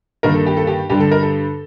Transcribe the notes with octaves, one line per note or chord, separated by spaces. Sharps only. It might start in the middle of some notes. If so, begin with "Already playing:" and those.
G2 D#3 A#3 A#4
A4
G4
A4
G4
G2 D3 G3 G4
A4
A#4
A4